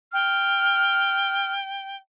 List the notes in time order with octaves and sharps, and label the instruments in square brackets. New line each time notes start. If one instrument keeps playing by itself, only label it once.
[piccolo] G5 [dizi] F6